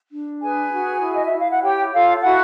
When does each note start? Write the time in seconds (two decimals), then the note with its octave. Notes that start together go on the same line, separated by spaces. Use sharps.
0.12 D4
0.42 G#4 B4 G#5
0.72 F#4
1.02 E4
1.15 D#5
1.26 E5
1.32 E4
1.38 F5
1.51 F#5
1.62 G4 C#5 G5
1.93 F4 A4 F5
2.23 E4 F#4 F#5